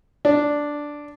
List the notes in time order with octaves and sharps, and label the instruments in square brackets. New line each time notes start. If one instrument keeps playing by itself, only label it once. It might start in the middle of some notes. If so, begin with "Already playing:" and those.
[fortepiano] D4